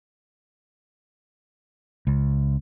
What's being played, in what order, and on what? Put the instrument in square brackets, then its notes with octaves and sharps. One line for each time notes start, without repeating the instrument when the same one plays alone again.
[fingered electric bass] C#2